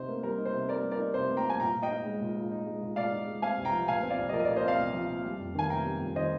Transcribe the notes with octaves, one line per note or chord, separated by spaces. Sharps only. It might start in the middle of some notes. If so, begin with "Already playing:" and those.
Already playing: C3 D#4 C5
A#3
G3 A#4
D#4
C5
C3
A#3 A#4 D5
G3
A#4 D5
D#4
C3 C5
A#3
G5 A#5
G3 G#5
A#2 G5 A#5
A#2
D#5 G5
D#4
G#3
A#2
A#2
D#4
G#3
A#2
A#2 D5 F5
D#4
G#3
C4 F5 G#5
C2
G5 A#5
F3
A#2 F5 G#5
C4
D5 F5
C2
D#5
F3 A#4 D5
D#5
A#2 A#4 D5
C5 D#5
C4 D5 F5
C2
F3
A#2
G3
F2
D#3 G#5
C3 G5 A#5
G3
F2
D#3 C5 D#5